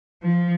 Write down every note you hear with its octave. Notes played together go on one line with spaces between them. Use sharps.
F3